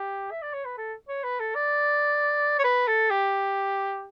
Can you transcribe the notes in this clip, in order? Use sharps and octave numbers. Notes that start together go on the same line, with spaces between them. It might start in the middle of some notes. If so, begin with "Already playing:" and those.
Already playing: G4
E5
D5
C#5
B4
A4
C#5
B4
A4
D5
C#5
B4
A4
G4